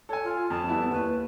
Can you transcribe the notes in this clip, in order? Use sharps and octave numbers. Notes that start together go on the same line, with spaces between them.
A4 C#5 G#5
F4
F2 A5
G3 B3 E4
D#2 B4